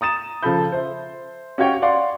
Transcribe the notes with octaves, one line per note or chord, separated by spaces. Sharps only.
A#5 D#6 A6 E7
C#3 F3 A4 A5 B5 G6
C5 E5
C#4 F#4 G4 C#5 F5 G5
D5 F5 F#5 C6